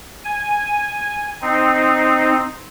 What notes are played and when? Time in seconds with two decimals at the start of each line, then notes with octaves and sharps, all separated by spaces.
0.24 G#5
1.41 C4 D#4